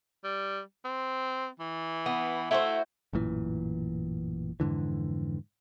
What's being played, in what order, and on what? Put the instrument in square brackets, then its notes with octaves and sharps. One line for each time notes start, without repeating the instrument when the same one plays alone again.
[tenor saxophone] G3
C4
E3
[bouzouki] B3
[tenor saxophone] A3 [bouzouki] E4 F#4 C5
[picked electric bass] A1 F#2 A#2 E3
F2 G#2 D3 E3